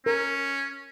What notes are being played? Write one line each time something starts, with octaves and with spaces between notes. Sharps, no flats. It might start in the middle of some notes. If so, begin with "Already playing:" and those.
C#4 A#4